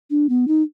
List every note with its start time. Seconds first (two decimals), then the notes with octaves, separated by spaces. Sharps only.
0.10 D4
0.29 B3
0.48 D#4